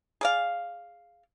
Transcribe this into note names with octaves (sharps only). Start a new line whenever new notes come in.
G#4 D5 F5